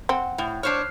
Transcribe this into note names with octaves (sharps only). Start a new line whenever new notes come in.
C4 F#5
A2
D4 C5 C#5 F6 F#6 C7